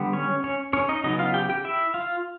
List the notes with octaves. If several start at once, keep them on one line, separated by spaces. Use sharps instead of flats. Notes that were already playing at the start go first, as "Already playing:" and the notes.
Already playing: D3 G3 B3
C#4 C#5
C#4 C#5
C#4 C#5
D#4 D#5
C#3 F#3 B3 D#4 D#5
F4 F5
G4 G5
G4 G5
E4 E5
F4 F5